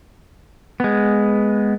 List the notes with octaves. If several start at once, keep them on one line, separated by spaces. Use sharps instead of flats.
G#3 B3